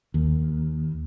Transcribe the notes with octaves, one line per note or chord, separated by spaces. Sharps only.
D#2